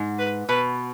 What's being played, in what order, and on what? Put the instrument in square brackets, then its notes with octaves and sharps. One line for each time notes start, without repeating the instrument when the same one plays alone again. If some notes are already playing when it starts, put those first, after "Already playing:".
Already playing: [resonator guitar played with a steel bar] G#2
[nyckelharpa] B4
[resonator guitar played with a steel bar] B2 [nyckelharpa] B4